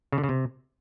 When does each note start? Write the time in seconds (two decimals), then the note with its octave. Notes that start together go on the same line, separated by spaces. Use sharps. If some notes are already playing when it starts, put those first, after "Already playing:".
0.12 C#3
0.18 D3
0.24 C#3
0.29 C3